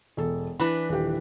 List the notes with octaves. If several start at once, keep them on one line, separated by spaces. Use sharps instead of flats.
E1 A4
E3 D4 B4 B5
D#1 G4